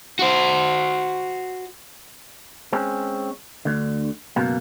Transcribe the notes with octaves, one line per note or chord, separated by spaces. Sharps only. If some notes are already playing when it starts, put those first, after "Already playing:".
F#4 C5
G#3 C4 C#4
D2 D3
C#2 F#2 B2 A#3